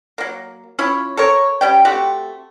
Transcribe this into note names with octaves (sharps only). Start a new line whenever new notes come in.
F#3 A#3
F3 C#4 E4 C#5
A4 A#4 C#5
G3 C#4 G5
A3 C4 F#4 G4